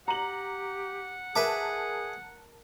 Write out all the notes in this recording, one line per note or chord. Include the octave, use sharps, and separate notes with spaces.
G4 F#5 A#5 F#7
G#4 A#4 B4 E5 A5 D6